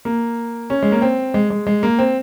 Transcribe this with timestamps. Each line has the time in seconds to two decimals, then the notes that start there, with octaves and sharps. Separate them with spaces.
0.05 A#3
0.70 C#4
0.83 G#3
0.92 A#3
1.02 C4
1.34 G#3
1.50 G#3
1.67 G#3
1.83 A#3
1.99 C4